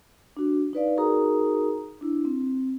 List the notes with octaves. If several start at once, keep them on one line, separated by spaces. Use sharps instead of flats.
D4 F#4
D#4 B4 D5 F5
D#4 F#4 G#4 A#4 A#5 D#6
D4 E4
C4